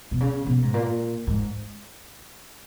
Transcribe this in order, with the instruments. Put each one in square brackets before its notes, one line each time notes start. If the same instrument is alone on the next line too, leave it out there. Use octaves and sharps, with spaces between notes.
[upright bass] B2
C#3
B2
G#2
A#2
G#2